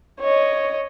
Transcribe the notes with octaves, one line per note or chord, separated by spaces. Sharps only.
C#5 D#5